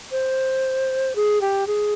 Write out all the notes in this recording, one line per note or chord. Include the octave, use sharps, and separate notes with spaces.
C5
G#4
G4
G#4